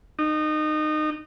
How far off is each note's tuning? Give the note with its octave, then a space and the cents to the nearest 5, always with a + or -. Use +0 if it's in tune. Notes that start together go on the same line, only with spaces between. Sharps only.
D#4 -25